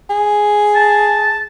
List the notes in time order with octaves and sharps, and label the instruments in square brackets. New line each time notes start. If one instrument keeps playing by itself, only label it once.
[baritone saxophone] G#4
[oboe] A5